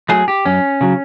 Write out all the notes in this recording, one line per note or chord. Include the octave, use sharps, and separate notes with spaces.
F#3 A3 G#4
G4
F#2 C#4
C#3 F#3